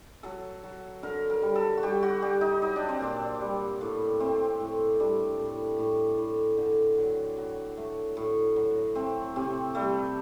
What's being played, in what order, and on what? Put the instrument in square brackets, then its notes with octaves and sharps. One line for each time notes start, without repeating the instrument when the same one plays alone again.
[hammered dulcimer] F#3 A4
F#3
D3 A#4
A#4
G3
A4
F#4
G3 G4
F#4
G3 G4
D#4
F#3 D#4
D4
C4
A#2 D4
G3
A2
A3 C4
A2
G3 D4
A2
A2
A2
D3
F#3
F#3
A3
A2
F#3
A3 C4
C3 C4
G3 A3